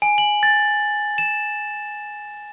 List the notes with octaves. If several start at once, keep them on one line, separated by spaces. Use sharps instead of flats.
G#5
F#7
A6
E7